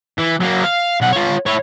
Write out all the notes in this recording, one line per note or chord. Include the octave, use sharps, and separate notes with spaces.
E3
F#3 A#3
F5
B1 F#5
F4 C#5
E4 C#5